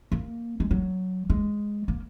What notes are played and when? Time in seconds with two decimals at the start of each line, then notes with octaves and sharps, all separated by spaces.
0.12 A#3
0.60 G#3
0.71 F#3
1.30 G#3
1.88 A#3